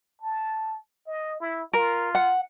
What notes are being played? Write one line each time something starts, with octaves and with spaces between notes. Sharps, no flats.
A5
D#5
E4
F4 A#4
F#5